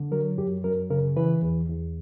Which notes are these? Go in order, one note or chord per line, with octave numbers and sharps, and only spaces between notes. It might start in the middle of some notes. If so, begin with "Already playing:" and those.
Already playing: D3
F#3 A#4
F#2 G4
F#2 A#4
C#3 A#4
E3 B4
E2
E2